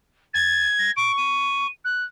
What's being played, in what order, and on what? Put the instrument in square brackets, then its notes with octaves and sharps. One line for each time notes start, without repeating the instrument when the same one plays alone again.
[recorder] G#6 [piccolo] A6
[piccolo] A#6
[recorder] C#6 [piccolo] D7
[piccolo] D#7
F#6